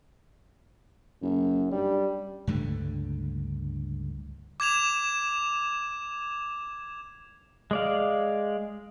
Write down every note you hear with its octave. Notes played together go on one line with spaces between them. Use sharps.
F#1 F#2
G2 G3
C#2 G2 D3 A3
D6 G#6 E7 F7
G#3 D5 F5